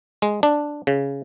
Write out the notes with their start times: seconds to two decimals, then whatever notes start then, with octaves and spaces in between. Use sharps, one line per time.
0.22 G#3
0.43 D4
0.87 C#3